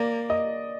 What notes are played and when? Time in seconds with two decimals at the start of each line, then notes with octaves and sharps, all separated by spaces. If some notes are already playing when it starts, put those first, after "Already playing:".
Already playing: A#3 D5
0.30 D#5